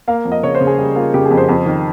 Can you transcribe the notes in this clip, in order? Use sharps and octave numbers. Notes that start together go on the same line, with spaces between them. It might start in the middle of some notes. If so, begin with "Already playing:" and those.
A#3 F5
F2
D#5
C#3 C#5
C5
C#3
G#4
G3
A#3 F4
C#3 G4
G#4
F2
C5
F2
D#3